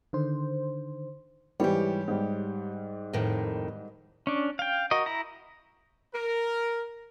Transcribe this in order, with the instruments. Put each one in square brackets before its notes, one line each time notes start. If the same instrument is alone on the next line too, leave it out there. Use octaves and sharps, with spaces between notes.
[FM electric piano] D3 D#3 C5
[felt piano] G#2 E3 G3 [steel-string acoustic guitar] G4 C#5
[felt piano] G#2 G3
[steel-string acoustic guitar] F2 A2 D#3
[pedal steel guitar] C#4 D4
F5 G5
F#4 A#4 D#5
E4 A#5
[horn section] A#4